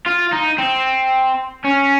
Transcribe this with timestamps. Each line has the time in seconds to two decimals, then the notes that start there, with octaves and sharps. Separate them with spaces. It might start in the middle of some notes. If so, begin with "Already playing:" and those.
0.07 F4
0.33 D#4
0.59 C4
1.64 C#4